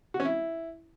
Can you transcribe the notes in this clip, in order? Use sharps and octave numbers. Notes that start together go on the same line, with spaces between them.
F#4
C#4
E4